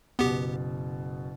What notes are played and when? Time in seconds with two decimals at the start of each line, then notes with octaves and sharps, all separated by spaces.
0.19 F#1 B2 B3 G4